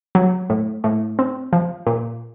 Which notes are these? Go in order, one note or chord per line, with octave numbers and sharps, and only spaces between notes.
F#3
A2
A2
C4
F3
A#2